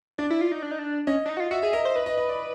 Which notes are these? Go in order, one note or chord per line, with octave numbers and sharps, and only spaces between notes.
D4 D5
E4
F4
D#4
D4
D#4
D4
C#4 D#5
D4
D#4
F#4
F4
F#4 E5
G#4 E5
A#4 D#5
C5
B4 D#5
D#5
D#5
D5